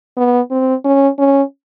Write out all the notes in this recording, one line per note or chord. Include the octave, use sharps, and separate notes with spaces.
B3
C4
C#4
C#4